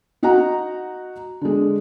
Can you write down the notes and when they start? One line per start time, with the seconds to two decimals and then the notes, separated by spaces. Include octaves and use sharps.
0.23 D#4 F#4 D#5 F#5 A#5
1.41 D3 G#3